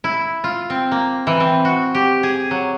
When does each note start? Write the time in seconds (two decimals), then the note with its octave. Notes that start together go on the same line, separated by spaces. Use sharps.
0.04 E4
0.44 F4
0.70 C4
0.91 A#3
1.27 E3
1.40 C4
1.65 F#4
1.95 G4
2.23 G#4
2.51 F#3